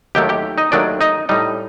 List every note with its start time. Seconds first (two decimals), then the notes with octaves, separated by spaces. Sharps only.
0.15 D#2 D#3 F#3 A3 G4 G5
0.29 G4 G5
0.58 D#4 D#5
0.72 D#2 D#3 F#3 A3 D4 D5
1.01 D#4 D#5
1.29 A2 G3 D#4 D#5